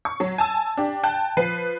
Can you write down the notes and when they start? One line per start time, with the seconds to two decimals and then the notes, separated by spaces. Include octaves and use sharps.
0.05 C#6
0.20 F#3
0.38 G#5 A5 E6
0.77 D4 G4
1.03 G5 A5 F#6
1.37 F3 B4 C7